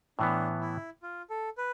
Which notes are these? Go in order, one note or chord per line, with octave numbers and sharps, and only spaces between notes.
A2 E3 B3 D4
E4
F4
A4
B4